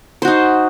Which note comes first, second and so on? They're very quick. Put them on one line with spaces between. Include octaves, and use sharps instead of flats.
C5 F#4 D#4